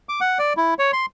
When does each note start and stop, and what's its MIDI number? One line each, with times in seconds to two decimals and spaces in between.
0.09 0.20 86
0.21 0.38 78
0.39 0.53 74
0.57 0.74 64
0.79 0.92 73
0.93 1.06 84